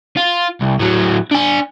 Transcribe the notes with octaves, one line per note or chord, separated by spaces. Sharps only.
F4
C2
A2 F#3
D4 G#5